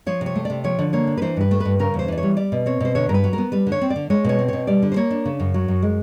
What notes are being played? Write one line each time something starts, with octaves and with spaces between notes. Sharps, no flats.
F3 C#5
C3
C#5
A3
C3 D5
F3 C#5
D3
A#3 C#5
D4
B4
E3 C5
G2 B4
A3
G2 B4
C#3 A#4
E2
C5
E3 D5
C#5
G3
G3 D5
B2
C4 C#5
B2 C5
D3 C#5
G2 A#4
B4
F#3
A#4
B3
G3 B4
D3
C#5
C4
D5
D3
G#3 C#5
B2 C#5
C4
B2 C#5
G3 D5
D3
C5
A#3 C#5
D4
C#3
F#2
F#3
F#2
G#3